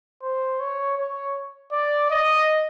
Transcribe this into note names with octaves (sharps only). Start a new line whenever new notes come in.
C5
C#5
C#5
D5
D#5